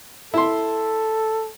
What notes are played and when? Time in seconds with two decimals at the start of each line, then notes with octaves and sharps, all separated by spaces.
0.34 E4 A4 C6